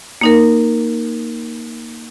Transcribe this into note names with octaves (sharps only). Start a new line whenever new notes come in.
A#3 D#4 A#4